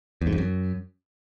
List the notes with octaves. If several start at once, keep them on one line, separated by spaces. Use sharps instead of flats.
E2
G#2
F2
F#2